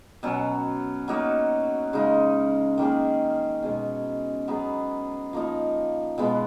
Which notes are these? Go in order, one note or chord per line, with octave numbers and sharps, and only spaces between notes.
B2 F#3 C#4
F#3 A#3 D#4 F#4
C#3 G#3 D#4 G#4
D#3 A#3 C#4 G#4
B2 G#3 C#4
F#3 B3 D#4 G#4
F3 A#3 D#4
B2 G#3 B3